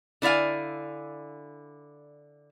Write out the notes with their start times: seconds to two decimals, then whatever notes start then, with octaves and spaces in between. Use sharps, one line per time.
0.22 D3 E4 D5 F5 G#5